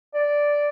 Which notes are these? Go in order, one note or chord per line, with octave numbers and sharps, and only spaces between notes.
D5